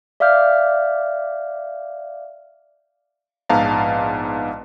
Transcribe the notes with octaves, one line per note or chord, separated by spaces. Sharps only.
D5 E5 F5 D6 F6 G6
A#1 G#2 B3 F5 A5 A#5